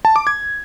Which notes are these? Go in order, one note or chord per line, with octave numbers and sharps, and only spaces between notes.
A5
D6
G#6